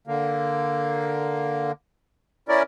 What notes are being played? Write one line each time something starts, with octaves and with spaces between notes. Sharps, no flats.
D3 A#3
C#4 E4 A#4 D5